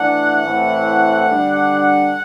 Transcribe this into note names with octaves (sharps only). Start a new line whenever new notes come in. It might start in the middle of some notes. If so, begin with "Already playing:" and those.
Already playing: E3 A3 D4 F#5
A2 E3 A3 C4
D3 G3 D4